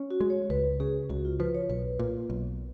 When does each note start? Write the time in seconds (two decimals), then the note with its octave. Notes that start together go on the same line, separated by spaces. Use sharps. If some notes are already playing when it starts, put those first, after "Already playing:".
Already playing: C#4
0.11 F#4
0.21 G#3
0.30 C#5
0.50 C#2 B4
0.80 C#3 G#4
1.10 C#2 F#4
1.25 F4
1.40 F3 B4
1.55 C#5
1.69 B1 B4
1.99 A#2
2.30 B1